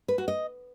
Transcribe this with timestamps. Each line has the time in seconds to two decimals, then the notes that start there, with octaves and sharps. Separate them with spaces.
0.08 B4
0.18 F#4
0.28 D#5